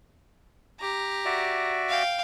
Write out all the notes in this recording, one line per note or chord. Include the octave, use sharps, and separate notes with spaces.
G4 A#5
F#4 D5 E5
F5 G5